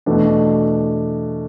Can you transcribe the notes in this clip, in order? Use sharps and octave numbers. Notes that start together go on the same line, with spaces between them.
E2 B2 A3 D4